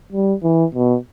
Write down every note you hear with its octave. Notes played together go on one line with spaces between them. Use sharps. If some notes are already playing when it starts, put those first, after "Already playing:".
G3
E3
B2